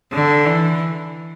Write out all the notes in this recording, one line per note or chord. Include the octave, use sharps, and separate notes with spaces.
D3
E3